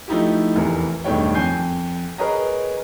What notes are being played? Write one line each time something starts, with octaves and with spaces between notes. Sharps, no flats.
F3 A3 D#4 E4 G4
F1 E2 E3 G4 A#4
E1 G2 D#3 A3 C#5 G5
F2 G#5 G6 C7
G#4 A#4 B4 C#5 D#5 A#5